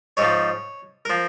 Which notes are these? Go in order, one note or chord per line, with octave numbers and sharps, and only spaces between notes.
G#2 F3 C#5
F3 A#4